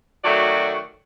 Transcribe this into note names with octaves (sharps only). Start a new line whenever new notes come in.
D#3 F#3 A3 F#4 C#5 D5